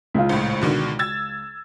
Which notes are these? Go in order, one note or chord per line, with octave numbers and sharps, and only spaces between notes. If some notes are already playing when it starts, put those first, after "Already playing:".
C#2 F4
A#1 A2
B2 D3 D#3
E6 G#6 A6